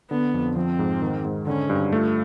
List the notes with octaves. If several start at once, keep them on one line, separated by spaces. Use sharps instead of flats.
D3 B3
F2
F3 C4
G#2
D#3
G#2
D3 C#4
G2
A3 F4